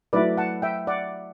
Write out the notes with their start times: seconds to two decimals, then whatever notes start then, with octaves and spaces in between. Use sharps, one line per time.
0.13 F#3 A3 E4 B4 D5
0.38 F#5 A5
0.62 E5 G5
0.87 D5 F#5